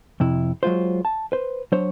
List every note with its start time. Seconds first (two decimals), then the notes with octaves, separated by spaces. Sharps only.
0.20 F2 C3 E4
0.63 F#3 G#3 F4 C5
1.05 A5
1.32 B4 C5
1.72 F#3 D4 C5 C#5